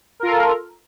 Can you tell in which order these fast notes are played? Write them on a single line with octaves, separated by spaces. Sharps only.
A#4 F4 A4